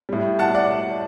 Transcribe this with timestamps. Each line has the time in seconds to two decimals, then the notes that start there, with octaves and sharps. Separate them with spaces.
0.09 A2 G3
0.39 F#5 A5
0.54 D5 F#5